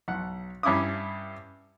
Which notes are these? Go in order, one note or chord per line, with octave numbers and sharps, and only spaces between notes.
B1 F#5
G2 C#4 E4 D6 D#6